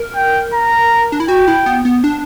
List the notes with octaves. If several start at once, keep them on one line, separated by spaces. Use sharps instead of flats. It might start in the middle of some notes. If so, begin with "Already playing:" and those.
Already playing: A#4
G5
A#5
D4
E4
F#4 G5
E4
B3
B3
D4